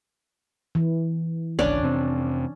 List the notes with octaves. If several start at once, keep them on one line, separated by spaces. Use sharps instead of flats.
E3
G#1 C#2 C#4 D4 D5
F2 C3 C4